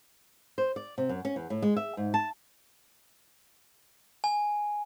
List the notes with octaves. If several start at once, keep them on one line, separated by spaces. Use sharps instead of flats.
C5
D5
C3
F#2
C#4
E2
A2
G#3
E5
G#2
A5
G#5